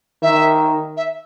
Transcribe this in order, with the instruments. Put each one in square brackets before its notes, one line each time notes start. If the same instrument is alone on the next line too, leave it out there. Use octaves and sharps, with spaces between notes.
[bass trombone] D#3 [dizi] E5
[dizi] E5